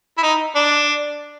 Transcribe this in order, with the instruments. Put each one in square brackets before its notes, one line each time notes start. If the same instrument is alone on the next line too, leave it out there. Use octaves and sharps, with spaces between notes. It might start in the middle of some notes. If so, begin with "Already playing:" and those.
[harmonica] E4
D#4
D4